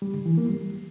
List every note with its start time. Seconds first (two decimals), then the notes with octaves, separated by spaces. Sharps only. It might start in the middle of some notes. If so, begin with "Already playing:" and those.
0.02 G3
0.14 D3
0.26 E3
0.38 A#3
0.49 G3